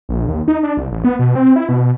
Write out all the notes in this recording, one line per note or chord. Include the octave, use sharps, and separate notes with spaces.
A#1
D#2
D#4
D4
C2
A1
B3
B2
C4
E4
B2